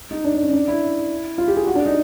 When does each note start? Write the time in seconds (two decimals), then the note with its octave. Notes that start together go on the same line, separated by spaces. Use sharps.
0.11 D#4
0.24 D4
0.35 D4
0.43 C#4
0.53 D4
0.68 E4
1.38 F4
1.48 G4
1.57 G#4
1.67 F#4
1.75 D4
1.86 D#4